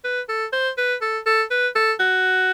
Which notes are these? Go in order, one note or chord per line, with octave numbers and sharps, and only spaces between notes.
B4
A4
C5
B4
A4
A4
B4
A4
F#4